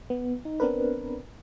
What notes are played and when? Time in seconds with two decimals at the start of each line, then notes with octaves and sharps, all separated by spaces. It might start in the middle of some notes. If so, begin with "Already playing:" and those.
0.10 B3
0.45 D#4
0.60 B3 C4 D4 A#4 B4